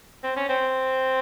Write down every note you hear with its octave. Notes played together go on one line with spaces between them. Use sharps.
C4
C#4
C4